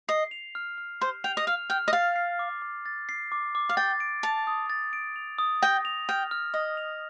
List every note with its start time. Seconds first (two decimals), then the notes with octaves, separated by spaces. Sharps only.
0.08 D#5 C7
0.31 F7
0.55 F6
0.78 F6
1.01 C5 C7
1.24 G5 F7
1.37 D#5
1.47 F5 F6
1.70 G5 F6
1.88 D#5
1.93 F5 A6
2.16 C7
2.39 D6
2.62 D6
2.86 A6
3.09 C7
3.32 D6
3.55 D6
3.69 F5
3.77 G5 A6
4.00 D7
4.23 A5 F7
4.47 D#6
4.70 A6
4.93 D7
5.16 F7
5.38 D#6
5.62 G5 A#6
5.85 F7
6.09 G5 F6
6.31 F6
6.54 D#5 A#6
6.77 F7